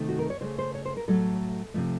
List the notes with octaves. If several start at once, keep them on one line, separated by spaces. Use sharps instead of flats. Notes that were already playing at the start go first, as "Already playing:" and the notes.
Already playing: C3 D#3 A3
F#4
A#4
C#5
C#3 A3 C5
C5
C#5
C5
A#4
A2 F#3 A3 A4
C3 F3 A3